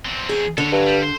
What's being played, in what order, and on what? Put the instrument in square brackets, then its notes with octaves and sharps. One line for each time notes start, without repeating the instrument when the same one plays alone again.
[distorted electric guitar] E2 C4
[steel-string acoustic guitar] G#4
[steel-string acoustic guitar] D3 [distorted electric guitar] A4 C#5
[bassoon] G2 [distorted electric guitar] F#3
[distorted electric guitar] G3
C5